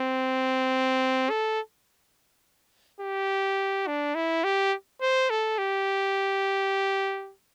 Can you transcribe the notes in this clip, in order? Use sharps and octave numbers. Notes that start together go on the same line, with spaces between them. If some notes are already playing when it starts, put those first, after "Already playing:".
Already playing: C4
A4
G4
D4
E4
G4
C5
A4
G4